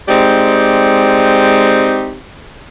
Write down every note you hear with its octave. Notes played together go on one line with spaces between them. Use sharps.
G#3 C4 D#4 G4 D5